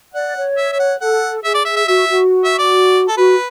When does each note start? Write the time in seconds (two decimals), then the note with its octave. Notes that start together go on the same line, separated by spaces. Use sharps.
0.14 D5 F#5
0.36 C#5
0.57 E5
0.72 E5
0.79 F#5
1.01 A4 F#5
1.44 G#4 E5
1.54 D5
1.65 E5
1.76 E5
1.87 F#4 E5
2.09 F#4
2.44 E5
2.59 D5
3.08 A4
3.17 F#4 B4